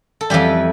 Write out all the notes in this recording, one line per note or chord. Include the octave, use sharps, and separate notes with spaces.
A4
F2 E3 G3 G4